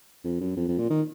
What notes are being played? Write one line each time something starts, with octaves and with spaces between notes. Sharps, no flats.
F2
F#2
F2
F2
A#2
D#3